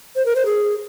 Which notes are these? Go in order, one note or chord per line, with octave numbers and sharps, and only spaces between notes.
C5
A#4
C5
G#4